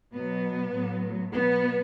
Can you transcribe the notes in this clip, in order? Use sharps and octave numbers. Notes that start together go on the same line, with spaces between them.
B2 F#3 B3
A2 F#3
B2 F#3 B3